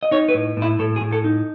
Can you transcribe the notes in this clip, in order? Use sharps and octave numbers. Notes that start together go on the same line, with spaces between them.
D#5
D#4 C#5
B4
A2
A2
E4
A2 A4
G#4
A2
A4
D#4